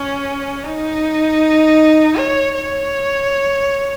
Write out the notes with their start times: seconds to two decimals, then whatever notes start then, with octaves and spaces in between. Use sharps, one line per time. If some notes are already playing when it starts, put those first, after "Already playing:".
Already playing: C#4
0.64 D#4
2.17 C#5
2.55 C#5